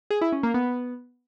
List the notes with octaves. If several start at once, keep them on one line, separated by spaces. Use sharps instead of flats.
G#4
E4
C#4
A#3
B3